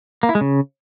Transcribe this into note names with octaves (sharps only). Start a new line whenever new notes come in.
A#3
E4
G#3
C#3